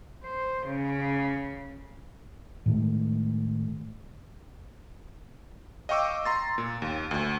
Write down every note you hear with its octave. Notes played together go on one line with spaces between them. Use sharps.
C5
C#3
A2 D#3 G#3 A3
D#5 F5 G5 C#6 D6 E6
A#5 C6 A6
A#2
D#2
D2